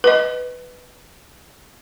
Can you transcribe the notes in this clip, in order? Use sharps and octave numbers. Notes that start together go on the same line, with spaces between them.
B4 D#5